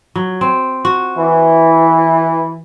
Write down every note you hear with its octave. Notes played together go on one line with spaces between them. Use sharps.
F#3
C4
F#4
E3